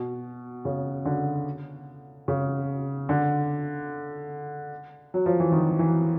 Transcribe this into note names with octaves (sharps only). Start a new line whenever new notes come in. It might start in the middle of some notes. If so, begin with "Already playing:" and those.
Already playing: B2
C#3
D3
C#3
D3
F#3
F3
E3
D#3
E3